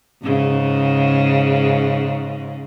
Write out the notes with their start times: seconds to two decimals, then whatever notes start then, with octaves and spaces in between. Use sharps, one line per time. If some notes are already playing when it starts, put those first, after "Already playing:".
0.23 G#2 C#3